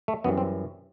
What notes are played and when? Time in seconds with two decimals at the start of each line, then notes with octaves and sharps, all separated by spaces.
0.08 A3
0.24 F#2 E3 G3 B3
0.38 C4